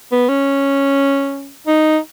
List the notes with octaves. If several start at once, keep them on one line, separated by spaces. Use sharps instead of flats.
B3
C#4
D#4